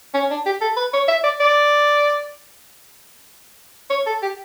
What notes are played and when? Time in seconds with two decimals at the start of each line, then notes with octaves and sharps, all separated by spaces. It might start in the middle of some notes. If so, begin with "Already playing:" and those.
0.14 C#4
0.30 D4
0.46 G4
0.61 A4
0.77 B4
0.94 C#5
1.08 E5
1.24 D5
1.40 D5
3.90 C#5
4.06 A4
4.22 G4